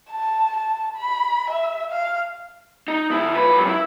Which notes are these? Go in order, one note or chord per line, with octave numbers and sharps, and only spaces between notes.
A5
A5
B5
E5
F5
D#4
D2 E4
F4 B4
G2 F#3
E4